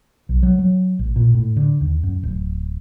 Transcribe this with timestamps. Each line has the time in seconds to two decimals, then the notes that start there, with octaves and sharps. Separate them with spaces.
0.29 B1
0.43 F#3
0.59 F#3
0.99 A1
1.16 A#2
1.34 A2
1.57 D3
1.81 D#2
2.03 F#2
2.23 D1